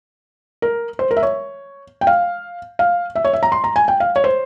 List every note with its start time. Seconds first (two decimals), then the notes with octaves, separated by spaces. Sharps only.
0.62 A#4
0.99 C5
1.11 A#4
1.17 E5
1.23 C#5
2.01 G5
2.07 F5
2.79 F5
3.15 E5
3.25 C#5
3.33 E5
3.43 A#5
3.52 C6
3.64 A#5
3.76 G#5
3.88 G5
4.00 F5
4.16 C#5
4.24 C5